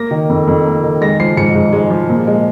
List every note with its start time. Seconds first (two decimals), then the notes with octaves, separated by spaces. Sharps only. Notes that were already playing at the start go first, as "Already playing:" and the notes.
Already playing: A#3 A#6
0.11 D#3
0.29 F2
0.47 F2
0.66 A#3
0.83 D#3
1.01 G#3 A#6
1.20 F3 C7
1.37 G#2 C#7
1.54 G#2
1.72 G#3
1.91 F3
2.09 A#2
2.27 G#3